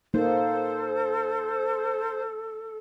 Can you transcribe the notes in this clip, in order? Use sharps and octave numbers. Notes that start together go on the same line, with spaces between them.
A#3 D#4 A4 C5